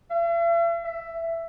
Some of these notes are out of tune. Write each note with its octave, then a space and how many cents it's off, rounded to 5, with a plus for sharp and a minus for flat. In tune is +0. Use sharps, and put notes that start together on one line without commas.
E5 +45
E5 +10